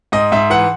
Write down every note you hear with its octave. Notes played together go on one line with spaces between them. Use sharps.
G#2 D#5
G#2 E5
E3 F#5